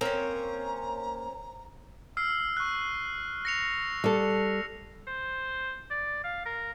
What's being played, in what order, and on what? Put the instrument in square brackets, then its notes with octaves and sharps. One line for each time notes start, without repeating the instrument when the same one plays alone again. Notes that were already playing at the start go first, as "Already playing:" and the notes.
[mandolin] A#3 [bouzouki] C4 C#4 [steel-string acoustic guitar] C#5 [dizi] A#5
[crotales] E6 F6 C7
C#6 F#6
A#6 C#7 F7
[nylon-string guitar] G3 A4
[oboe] C5
D5
F5
A#4